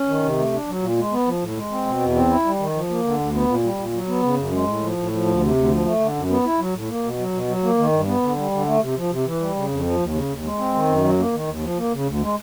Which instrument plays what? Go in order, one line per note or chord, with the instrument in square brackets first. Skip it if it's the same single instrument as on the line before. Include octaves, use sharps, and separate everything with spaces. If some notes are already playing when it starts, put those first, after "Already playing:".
Already playing: [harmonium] C#4
D#3
C3
A3
D4
F#3
A#2
G#3
B3
F3
A2
G#3
C4
B2
E2
C4
E4
G3
D#3
F3
A#3
D3
D2
B3
A#2
G3
A#2
F#3
B3
C#3
F#2
G#3
A2
F3
A2
F3
D2
C3
D2
F3
A3
D3
F#2
B3
E4
F#3
A2
A#3
B2
F#3
B2
F#3
A#3
D#3
G2
B3
D3
G3
D3
A3
C3
F3
C3
E3
G3
C#3
F2
F3
D#2
C#3
D#2
G#3
C4
D#3
F#2
F#3
A#3
D#3
D#2
F3
A#3
C#3
D2
G#3